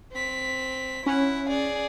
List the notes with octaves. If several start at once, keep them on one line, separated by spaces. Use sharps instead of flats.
C4 B6
C#4 E4 F#5
G#4 D5